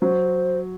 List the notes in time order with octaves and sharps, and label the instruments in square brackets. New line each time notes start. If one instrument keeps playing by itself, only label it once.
[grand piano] F#3 [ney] C5